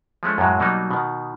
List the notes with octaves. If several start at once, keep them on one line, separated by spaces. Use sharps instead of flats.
F3 G#3 A3 C#4
F#2 A2 F#3 G#3
B2 F#3 G3 A#3 D#4
B2 D#3